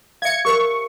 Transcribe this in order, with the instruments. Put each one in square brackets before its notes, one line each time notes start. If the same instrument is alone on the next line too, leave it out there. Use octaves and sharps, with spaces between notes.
[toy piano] E5 F5 [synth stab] G#6 C#7
[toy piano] G4 A#4 C5 [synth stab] C#6